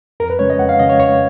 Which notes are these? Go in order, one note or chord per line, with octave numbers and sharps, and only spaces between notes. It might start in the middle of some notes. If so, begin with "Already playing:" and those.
F2 A#4
B4
C#3 G#3 C#4 C#5
D#5
F2 F#5
F5
C#3 G#3 C#4 D#5
C#5
F2 C#5